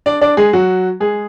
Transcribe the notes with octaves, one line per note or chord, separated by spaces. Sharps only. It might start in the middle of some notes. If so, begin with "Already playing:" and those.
D4 D5
D4 D5
G#3 G#4
F#3 F#4
G#3 G#4